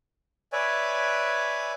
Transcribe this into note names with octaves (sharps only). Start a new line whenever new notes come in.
B4 C#5 D5 E5 G#5